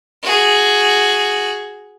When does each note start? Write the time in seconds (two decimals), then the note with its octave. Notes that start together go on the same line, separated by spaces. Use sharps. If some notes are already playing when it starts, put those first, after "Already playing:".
0.23 F#4 G#4